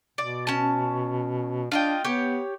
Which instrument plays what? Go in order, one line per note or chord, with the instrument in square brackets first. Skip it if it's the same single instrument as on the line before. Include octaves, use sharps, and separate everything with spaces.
[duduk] B2 [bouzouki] D5
[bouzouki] C#4 A5
[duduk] D4 [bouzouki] F4 D#5 G5
[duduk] B3 [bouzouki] G4 C#5